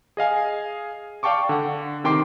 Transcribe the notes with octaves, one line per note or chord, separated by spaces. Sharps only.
G#4 D#5 F5 G#5
D5 F5 G5 A5 C#6 D6
D3 F#5
C3 D#3 G5 C6 D6 C7